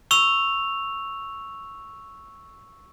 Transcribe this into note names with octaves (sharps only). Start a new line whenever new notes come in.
C#6 E6 F7